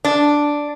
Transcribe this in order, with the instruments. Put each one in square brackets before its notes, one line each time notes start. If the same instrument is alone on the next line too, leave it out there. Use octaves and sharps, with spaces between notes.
[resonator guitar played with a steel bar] D4